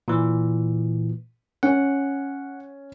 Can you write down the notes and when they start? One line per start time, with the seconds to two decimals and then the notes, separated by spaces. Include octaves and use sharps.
0.08 A#2 E3
1.63 C#4 F#5